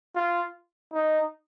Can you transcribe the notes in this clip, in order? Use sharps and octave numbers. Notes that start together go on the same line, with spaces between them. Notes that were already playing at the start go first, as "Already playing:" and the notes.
F4
D#4